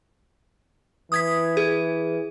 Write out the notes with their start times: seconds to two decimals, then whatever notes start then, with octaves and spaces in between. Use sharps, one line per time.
1.12 E3 D#6 G#6 B6
1.57 G#4